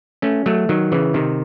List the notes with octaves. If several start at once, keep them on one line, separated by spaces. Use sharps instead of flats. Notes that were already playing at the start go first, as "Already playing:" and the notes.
A3 C#4
F#3 A3
D#3 F#3
C#3 E3
C3 D#3